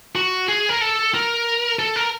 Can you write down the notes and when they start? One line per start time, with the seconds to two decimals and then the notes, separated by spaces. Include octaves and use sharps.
0.15 F#4
0.48 G#4
0.69 A#4
0.81 A4
1.14 A#4
1.79 A4
1.96 A#4